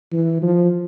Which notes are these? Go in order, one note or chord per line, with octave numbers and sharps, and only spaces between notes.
E3
F3